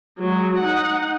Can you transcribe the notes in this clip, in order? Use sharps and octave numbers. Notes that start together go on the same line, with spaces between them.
F#3 G#3
D#4 F#5